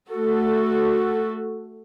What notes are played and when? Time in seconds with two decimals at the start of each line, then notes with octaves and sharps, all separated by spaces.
0.11 A3 F#4 A4